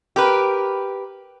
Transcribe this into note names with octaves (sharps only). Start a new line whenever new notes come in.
G4 A#4 B4